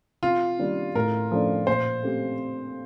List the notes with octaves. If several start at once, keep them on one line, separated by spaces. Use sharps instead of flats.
C3 F4
D#3 G3 A#3 D4
A2 A#4
F3 A3 D4
A#2 C5
A3 C4 G4